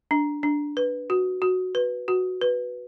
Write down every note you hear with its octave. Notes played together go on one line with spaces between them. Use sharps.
D4
D4
B4
F#4
F#4
B4
F#4
B4